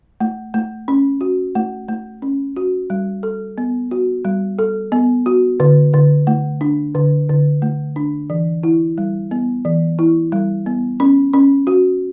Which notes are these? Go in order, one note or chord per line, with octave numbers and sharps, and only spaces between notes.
A3
A3
C#4
F#4
A3
A3
C#4
F#4
G3
A4
B3
F#4
G3
A4
B3
F#4
D3
D3
A3
D4
D3
D3
A3
D4
E3
E4
G3
B3
E3
E4
G3
B3
C#4
C#4
F#4